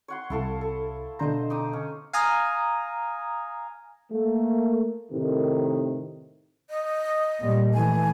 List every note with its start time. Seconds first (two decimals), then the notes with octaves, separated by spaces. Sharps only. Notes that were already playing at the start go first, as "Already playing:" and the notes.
0.08 C#5 F#5 C6
0.30 C2 E4 A4 F5
0.61 A4
1.19 B2 D3 C5 D#5 A#5
1.50 D#4 D6 D#6
1.73 C#4
2.13 F5 G#5 A#5 D#6
4.12 A3 A#3
5.11 A2 C3 D#3
6.70 D#5
7.40 A#2 G3
7.74 E3 A3 G#5